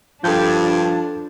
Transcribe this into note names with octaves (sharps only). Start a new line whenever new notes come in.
G2 F3 D4 A4 G6